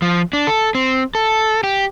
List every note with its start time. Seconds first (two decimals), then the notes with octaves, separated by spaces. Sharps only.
0.02 F3
0.33 D4
0.47 A4
0.75 C4
1.15 A4
1.64 G4